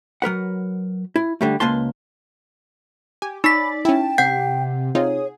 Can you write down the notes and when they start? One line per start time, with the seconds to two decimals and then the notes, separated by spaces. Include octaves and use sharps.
0.22 F#3 A#4 B4 F#5
1.16 E4
1.41 D3 G3 A3
1.60 C#2 A#3 B4 A5 C6
3.22 G4 G#5
3.44 D#4 C#5 D5 B5 B6
3.85 C#4 E4 G5 A5
4.18 C3 F#5 G6 C7
4.95 C3 D#4 F4 G#4 C#5